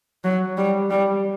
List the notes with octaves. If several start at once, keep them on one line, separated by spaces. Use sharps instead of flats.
F#3
G3
G3